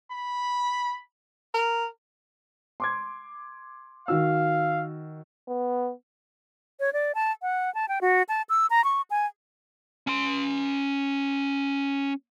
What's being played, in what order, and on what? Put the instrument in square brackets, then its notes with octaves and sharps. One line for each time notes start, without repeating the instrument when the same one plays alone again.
[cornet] B5
[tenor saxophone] A#4
[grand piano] C6 D6 G#6
[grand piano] D#3 F#4 E6 [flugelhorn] F5
[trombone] B3
[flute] C#5
D5
A5
F#5
A5
G5
F#4
A5
E6
A#5
C#6
G#5
[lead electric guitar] C#4 C6